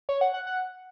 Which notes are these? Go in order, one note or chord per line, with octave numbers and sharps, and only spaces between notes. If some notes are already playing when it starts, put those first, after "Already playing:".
C#5
F#5
F#5
F#5